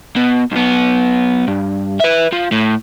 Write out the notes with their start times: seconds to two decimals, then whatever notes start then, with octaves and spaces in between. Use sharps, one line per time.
0.17 B2
0.51 B1 B3
1.48 G2
2.00 B4 E5
2.32 F3
2.52 A2